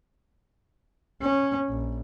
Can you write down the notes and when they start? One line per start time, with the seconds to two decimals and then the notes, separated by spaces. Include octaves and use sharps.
1.21 C#4
1.69 A#1